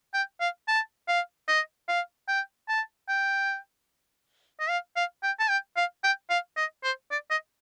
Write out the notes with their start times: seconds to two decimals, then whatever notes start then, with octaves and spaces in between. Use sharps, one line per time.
0.14 G5
0.40 F5
0.68 A5
1.08 F5
1.48 D#5
1.88 F5
2.28 G5
2.69 A5
3.08 G5
4.60 D#5
4.69 F5
4.96 F5
5.23 G5
5.39 A5
5.49 G5
5.76 F5
6.03 G5
6.30 F5
6.57 D#5
6.83 C5
7.11 D5
7.30 D#5